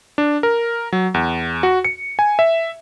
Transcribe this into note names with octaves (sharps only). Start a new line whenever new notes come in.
D4
A#4
F#3
E2
F#4
C#7
G#5
E5